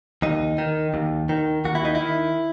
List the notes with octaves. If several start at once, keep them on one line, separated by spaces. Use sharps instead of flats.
D#2 D#4
D#3
D#2
D#3
D#2 F#4
E4
D#4
E4
D#3